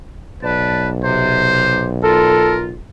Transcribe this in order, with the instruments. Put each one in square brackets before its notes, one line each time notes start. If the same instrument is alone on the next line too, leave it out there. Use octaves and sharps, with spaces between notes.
[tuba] B1 [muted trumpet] B4 [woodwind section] D5 A5
[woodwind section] C3 [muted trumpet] C5
[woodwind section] F4 [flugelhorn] A4 [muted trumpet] A#4